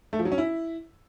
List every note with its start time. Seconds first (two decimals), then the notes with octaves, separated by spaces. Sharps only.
0.13 A3
0.19 F3
0.25 F#3
0.32 C#4
0.38 E4